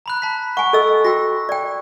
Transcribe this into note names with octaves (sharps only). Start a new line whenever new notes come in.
A#5 B5 F#6
A5 B6
F#5 G#5 C#6
A4 D#5 E6
F#4 G5 E6 A#6
D5 G5